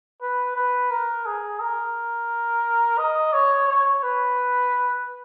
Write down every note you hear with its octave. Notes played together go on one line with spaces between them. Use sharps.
B4
B4
A#4
G#4
A#4
D#5
C#5
C#5
B4